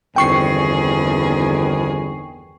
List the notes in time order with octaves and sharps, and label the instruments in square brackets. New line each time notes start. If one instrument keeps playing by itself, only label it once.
[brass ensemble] G1 D#3 C4 [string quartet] E2 G#4 [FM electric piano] G5 C#6 C7